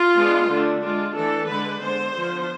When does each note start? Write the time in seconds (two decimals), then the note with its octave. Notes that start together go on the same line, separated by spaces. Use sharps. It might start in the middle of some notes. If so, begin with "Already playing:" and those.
Already playing: F4
0.16 G#3 B3 D4
0.49 D3 A3 D4
0.82 G#3 D4 F4
1.15 E3 A3 D4 A4
1.48 D3 G#3 D4 B4
1.81 D3 G#3 B3 C5
2.14 D3 F3 B3